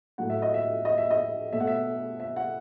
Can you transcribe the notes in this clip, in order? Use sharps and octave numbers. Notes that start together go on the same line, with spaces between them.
A2 F#3 A3 F#5
E5
D#5
E5
D#5
E5
D#5
B2 A3 E5
F#5
E5
E5
F#5